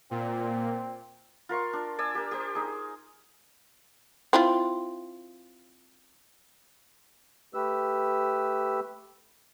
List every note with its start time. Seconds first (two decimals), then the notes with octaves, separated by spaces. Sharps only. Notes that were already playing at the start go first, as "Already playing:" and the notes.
0.11 A#2 C4
1.49 F4 A#4 C6 C#6
1.73 D4
1.98 D5 G#5 E6
2.15 G4 A#4
2.31 G4 C5
2.55 D#4 G#4
4.33 C4 E4 F4
7.54 A3 G4 B4 E6